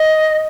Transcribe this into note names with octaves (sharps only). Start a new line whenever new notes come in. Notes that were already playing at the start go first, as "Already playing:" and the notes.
Already playing: D#5